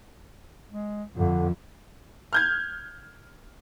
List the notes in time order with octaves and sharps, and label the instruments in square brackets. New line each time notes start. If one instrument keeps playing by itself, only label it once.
[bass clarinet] G#3
[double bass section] F2 [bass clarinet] D3
[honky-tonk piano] F6 G6 G#6